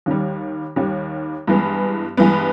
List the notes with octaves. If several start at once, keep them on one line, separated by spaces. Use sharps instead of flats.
D#2 D#3 G3
D#2 D#3 G3
G2 E3 G#3 B3
G2 E3 G#3 B3